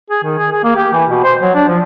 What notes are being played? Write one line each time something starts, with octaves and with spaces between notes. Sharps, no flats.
G#4
D#3
G#4
G#4
A#3
G4
E3
B2
C5
F#3
D4
F3